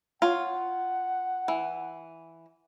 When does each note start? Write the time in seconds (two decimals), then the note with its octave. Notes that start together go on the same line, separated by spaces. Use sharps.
0.22 F4 C#5 F#5
1.48 E3